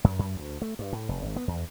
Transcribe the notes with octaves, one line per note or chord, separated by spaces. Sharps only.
F#2
F#2
D2
A3
G2
A2
F1
G#1
B3
E2